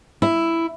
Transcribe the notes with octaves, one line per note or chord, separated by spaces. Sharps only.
E4